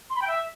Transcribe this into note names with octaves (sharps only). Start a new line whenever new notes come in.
C6
B5
G5
E5